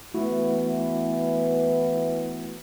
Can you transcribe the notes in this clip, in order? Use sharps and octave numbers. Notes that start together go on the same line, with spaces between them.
E3 A3 B3 E4 F#4